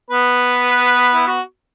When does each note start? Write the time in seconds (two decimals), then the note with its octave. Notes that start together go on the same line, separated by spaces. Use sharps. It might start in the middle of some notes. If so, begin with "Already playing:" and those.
0.10 B3 B4
1.13 E4
1.27 F#4